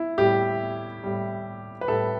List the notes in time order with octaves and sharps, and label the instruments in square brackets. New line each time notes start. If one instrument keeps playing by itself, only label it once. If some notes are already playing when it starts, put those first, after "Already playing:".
Already playing: [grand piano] E4
A2 G3 G4
A2 G3
B4
A2 G3 A4